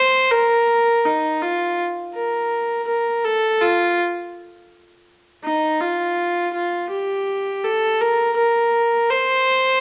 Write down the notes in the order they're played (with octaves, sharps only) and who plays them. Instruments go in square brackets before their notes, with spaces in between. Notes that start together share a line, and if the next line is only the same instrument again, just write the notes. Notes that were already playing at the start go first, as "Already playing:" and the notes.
Already playing: [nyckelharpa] C5
A#4
D#4
F4
A#4
A#4
A4
F4
D#4
F4
F4
G4
A4
A#4
A#4
C5